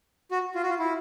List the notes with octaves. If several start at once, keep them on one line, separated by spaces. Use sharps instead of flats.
F#4
F4
F#4
F4
E4